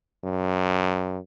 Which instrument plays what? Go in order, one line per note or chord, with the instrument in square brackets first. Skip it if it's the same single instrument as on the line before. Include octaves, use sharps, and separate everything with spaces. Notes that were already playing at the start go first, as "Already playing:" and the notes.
[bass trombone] F#2